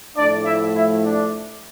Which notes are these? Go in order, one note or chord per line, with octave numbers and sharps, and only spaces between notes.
A2 F3 A3 D4 D5
E4 E5
E4 E5
D4 D5